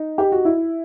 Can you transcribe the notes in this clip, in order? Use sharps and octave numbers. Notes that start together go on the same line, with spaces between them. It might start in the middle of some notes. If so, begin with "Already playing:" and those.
Already playing: D#4
G4
F#4
E4